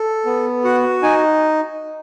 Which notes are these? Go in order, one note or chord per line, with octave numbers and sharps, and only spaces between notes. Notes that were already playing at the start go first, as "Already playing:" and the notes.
Already playing: A4
B3
F#4 F#5
D#4 G#5